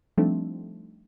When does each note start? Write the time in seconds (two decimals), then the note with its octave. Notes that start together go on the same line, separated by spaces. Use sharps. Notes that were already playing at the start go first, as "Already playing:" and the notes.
0.18 F3 G3 A3 C4 D4 D#4